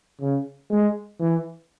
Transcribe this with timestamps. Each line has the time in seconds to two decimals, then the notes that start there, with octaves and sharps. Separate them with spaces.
0.21 C#3
0.71 G#3
1.20 E3